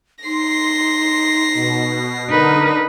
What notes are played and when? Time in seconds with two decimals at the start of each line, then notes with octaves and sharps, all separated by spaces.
0.25 D#4 C6 A#6 C7
1.54 B2
2.30 D3 D#4 A#4 B4 D#6